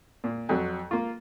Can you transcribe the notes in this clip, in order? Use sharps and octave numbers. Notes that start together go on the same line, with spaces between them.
A#2
F2 F#3
A#3 F4